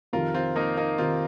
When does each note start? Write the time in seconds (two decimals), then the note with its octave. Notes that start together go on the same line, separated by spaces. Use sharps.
0.13 F2 C3 D#3 F4 A#4
0.34 C4 F4
0.56 A#3 D#4
0.77 A#3 D#4
0.98 C3 D#3 C4 F4